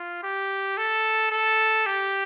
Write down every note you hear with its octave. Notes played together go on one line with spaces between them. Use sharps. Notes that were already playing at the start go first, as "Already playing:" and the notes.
Already playing: F4
G4
A4
A4
G4